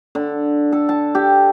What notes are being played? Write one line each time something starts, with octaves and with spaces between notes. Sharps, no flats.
D3
A4
A5
G4